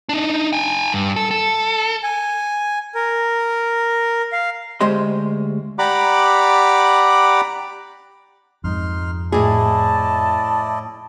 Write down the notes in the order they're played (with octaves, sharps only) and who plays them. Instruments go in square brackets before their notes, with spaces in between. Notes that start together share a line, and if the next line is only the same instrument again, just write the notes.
[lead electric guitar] D4 D#4
G5 G#5
G2
A4
A4
[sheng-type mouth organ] G#5
A#4
F5
[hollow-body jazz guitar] D2 G#3 G4 C5 D#5 C6
[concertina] G4 D5 F#5 A#5 B5 D6
[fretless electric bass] F2 G#2 G#3 [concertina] D#4 C6 F6
[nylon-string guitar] A2 G#4 [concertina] E4 D5 D#5 [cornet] A5